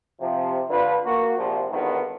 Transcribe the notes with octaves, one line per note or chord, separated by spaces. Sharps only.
C3 F3
D3 D4 F4 B4
A#3 F#4
A#1 C3 F3
G#1 G2 D3 D#3 B3 F4